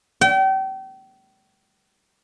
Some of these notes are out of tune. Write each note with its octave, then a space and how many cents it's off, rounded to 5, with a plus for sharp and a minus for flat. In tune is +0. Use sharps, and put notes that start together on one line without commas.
G5 -35